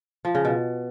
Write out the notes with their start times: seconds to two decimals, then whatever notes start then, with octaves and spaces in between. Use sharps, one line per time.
0.25 F3
0.35 C#3
0.45 B2